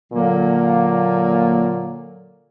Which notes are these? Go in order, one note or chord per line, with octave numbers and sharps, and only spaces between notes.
A#2 D3 F#3 A#3